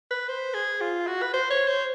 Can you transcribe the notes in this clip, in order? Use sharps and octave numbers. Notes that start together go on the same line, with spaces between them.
B4
C5
G#4
F4
F#4
B4
C5
C#5
C5